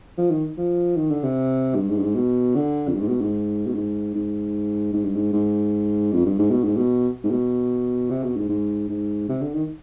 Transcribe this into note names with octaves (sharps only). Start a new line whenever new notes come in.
F3
D#3
F3
D#3
D3
C3
G2
G#2
G2
G#2
B2
D3
F2
G2
G#2
B2
G#2
B2
G#2
G#2
G#2
G2
G#2
G#2
F2
G2
G#2
B2
G#2
B2
G#2
B2
C3
B2
G#2
G#2
G#2
C3
D3
D#3